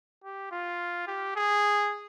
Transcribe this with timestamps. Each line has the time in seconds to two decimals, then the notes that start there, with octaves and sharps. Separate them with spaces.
0.24 G4
0.51 F4
1.07 G4
1.36 G#4